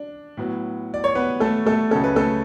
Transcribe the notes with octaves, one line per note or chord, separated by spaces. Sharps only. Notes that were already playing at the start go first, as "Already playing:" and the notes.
Already playing: D4
A2 F#3 B3
D5
C#5
B3 B4
A3 A4
A3 A4
C#2 C#3 F#3 A3 C#4 A4
B4
A3 A4